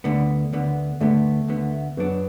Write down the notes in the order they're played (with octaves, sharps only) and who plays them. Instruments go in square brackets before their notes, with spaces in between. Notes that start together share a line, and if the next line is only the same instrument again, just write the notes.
[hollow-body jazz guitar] D2 D3 B3 [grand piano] A3
[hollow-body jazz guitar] D2 D3 B3
[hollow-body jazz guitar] D2 D3 B3 [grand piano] A3
[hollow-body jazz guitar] D2 D3 B3
[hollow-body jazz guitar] F#2 F#3 D4 [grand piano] B3